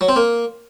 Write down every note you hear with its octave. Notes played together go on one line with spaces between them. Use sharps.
F#3
C4
A#3